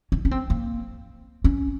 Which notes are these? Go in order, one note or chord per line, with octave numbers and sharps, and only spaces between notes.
C#4
C#4
C4
A#3
C#4